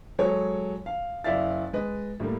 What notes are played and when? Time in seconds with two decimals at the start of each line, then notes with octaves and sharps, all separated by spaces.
0.19 F#3 G#3 G#4 A4 C#5
0.86 F5
1.24 F#1 E4 D5 E5 F5 A6
1.73 G#3 B4 D#5
2.20 A2 G3 A3 A#3